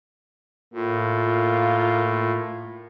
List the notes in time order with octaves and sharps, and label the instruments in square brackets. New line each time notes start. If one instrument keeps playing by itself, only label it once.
[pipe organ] A2 [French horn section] A#3 F4